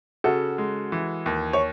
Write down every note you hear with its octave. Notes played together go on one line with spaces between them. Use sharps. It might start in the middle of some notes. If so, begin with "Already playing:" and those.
C#3 F#4 A4
G#3
E3
D#2
C#5